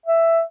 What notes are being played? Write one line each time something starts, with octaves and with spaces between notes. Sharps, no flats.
E5